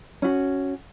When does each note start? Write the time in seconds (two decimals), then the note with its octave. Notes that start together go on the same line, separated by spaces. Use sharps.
0.22 C#4 F#4